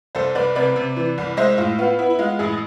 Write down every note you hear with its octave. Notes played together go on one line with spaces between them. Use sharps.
C2 A4 C5
C2 B4 D5
C3 B4 D5
C3
E3
C2
G#3 C5 E5
A2 F4
B3 F4
B3 E4
E4
G#3 F4
A1 E4 G#4